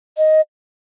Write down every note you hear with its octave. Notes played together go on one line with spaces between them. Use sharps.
D#5